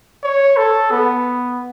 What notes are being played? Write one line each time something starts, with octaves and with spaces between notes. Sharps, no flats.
C#5
A4
B3